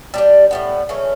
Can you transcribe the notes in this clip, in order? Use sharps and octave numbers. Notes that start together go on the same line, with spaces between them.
G3 D4 G4
A2 G3 B3
C#3 E3 A3 C#4